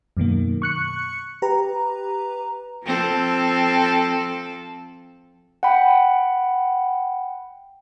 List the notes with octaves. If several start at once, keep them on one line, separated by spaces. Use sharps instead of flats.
F#2 B2 D#3 A#3
C#6 F#6 C#7
G4 B4 A#5
F3 C4 A4
F#5 G5 B5